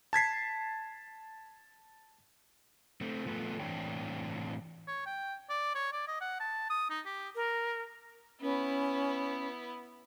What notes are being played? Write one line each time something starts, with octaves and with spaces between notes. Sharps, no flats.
A5 G#6 B6 C7
A3 C4
F3 A3 B3
A2 E3 C4 D4 C#5 G5
C#5
G5
D5
C#5
D5
D#5
F#5
A5
D#6
D#4
G4
A#4
B3 C#4 E4